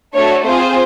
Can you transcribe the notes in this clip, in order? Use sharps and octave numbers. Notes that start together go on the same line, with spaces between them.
A3 D4 F#4 A4 C#5
C4 F4 G#4 C5